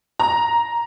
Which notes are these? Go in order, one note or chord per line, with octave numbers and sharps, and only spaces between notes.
A#5